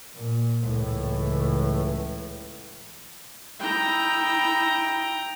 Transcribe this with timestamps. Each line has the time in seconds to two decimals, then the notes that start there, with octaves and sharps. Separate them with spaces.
0.16 A#2
0.62 C#2 A2 E3
3.60 D#4 E4 G5 A#5